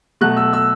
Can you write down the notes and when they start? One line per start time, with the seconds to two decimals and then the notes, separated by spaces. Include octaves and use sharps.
0.21 B2 F#3 A3 F#6
0.37 E6
0.53 E6